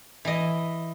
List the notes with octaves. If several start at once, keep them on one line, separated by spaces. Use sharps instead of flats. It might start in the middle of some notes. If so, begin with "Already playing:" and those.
E3 D#5